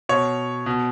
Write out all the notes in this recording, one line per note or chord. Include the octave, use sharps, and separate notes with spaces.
B2 C#5
B2